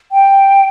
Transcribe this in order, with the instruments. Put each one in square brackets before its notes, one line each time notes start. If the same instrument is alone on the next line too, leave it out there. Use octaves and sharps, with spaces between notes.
[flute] G5